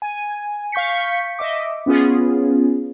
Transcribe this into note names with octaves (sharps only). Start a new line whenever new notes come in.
G#5
F5 C#6 G6 B6 C#7
D#5 E5 D6
B3 C#4 F4 G#4